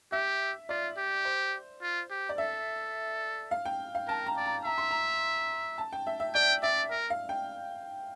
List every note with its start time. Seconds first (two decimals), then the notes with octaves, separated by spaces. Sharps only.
0.12 G4 E5
0.69 F4 D5
0.97 G4
1.25 C5
1.82 F4
2.10 G4
2.29 D5
2.38 A4 E5
3.51 F5
3.65 G5
3.95 F5
4.08 A#4 A5
4.27 A#5
4.37 D5
4.46 A#5
4.65 E5 A#5
4.78 C6
4.91 A#5
5.78 A5
5.93 G5
6.07 E5
6.20 E5
6.35 D5 G5
6.63 D5 E5
6.91 A#4
7.10 F5
7.29 G5